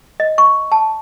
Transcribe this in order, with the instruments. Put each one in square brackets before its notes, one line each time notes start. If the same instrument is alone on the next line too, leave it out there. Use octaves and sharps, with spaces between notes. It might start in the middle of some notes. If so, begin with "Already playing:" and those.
[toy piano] D#5
C#6
A5